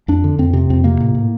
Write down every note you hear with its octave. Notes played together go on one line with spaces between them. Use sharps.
F2 D4
D3
F2 C4
C3 C4
F2 C4
C3 A#3
A2
A2